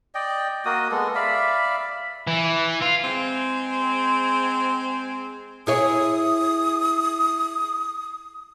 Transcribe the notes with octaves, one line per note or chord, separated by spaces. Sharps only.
D5 D#5 G5
A#3 F#4 D#5 D#6
G#3 B3 A4
D5 E5 F5 B5
E3
F4
G#3 C4
E4 G#4 C#5 D#6